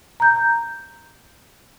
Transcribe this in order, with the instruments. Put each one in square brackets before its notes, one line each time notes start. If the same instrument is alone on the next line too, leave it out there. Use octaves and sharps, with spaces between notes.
[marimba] A#5 G6